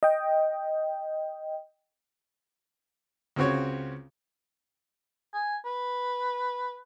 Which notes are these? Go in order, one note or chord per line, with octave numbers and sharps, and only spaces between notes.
D#5 G5
C#2 C#3 C4 F#4 C#5
G#5
B4